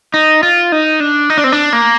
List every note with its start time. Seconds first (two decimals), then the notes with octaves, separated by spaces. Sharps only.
0.14 D#4
0.43 F4
0.72 D#4
1.00 D4
1.30 D#4
1.38 D4
1.44 C4
1.52 D4
1.73 A#3